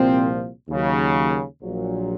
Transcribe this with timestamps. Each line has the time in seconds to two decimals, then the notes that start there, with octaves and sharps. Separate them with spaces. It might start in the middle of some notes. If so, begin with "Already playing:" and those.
Already playing: C2 A#2 F3 C4
0.68 D#2 C#3 F#3
1.61 A#1 A#2 F#3